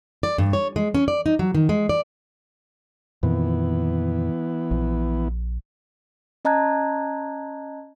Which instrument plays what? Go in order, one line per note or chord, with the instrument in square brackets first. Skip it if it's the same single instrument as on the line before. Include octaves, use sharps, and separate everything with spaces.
[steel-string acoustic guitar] D5
G2
C#5
G#3
C#4
D5
D#4
F#3
D#3
G#3
D5
[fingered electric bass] F2 A#2 D#3 [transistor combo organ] E3 B3
[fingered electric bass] A#1
[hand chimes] C#4 D#5 A5 A#5 F#6 G#6